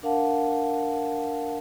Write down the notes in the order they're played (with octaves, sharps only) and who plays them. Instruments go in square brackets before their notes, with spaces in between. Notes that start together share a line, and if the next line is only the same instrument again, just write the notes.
[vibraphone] D4 A#4 F5 F#5 A5